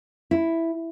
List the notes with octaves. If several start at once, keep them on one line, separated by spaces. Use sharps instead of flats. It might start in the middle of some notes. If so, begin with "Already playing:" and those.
E4